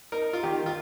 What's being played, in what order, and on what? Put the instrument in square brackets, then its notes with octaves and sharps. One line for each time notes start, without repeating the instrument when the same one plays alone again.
[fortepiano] D#4 A#4
F4
D#3 G4
F4